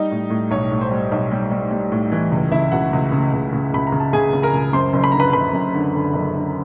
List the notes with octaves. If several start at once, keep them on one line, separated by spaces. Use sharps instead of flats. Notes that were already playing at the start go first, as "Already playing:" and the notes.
Already playing: G3 D#4 D#5
A2
A2
B1 C#5
A2
C5
G3
B1 C#5
G3
G3
G3
A2
E3
C#2
C#3 E4 E5
C#2 F#4 F#5
C#2
C#3
C#2
C#3
C#2 B5
A#5
C#3
A5
C#3 G#4 G#5
C#3
A#4 A#5
C#2
F#2 C5 C6
F#1
B5
D3 A#5
B4 B5
F#1 B4 B5
F#2
D3
D3
F#1
D3